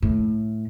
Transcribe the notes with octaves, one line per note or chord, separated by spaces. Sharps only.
A2